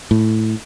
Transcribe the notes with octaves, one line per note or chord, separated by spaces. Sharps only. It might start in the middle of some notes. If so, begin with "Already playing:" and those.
A2